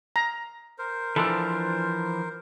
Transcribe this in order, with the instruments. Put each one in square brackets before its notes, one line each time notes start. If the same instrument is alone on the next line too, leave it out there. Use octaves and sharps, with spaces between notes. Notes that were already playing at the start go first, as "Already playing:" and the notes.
[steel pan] A#5
[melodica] A#4 C5
[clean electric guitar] E3 F3 D4 [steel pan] A4